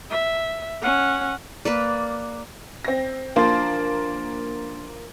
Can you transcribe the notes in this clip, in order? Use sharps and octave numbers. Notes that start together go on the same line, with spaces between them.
E5
C#4 F#5
A#3 B4 D5
C4 A#6
F3 A#3 D4 C6 A6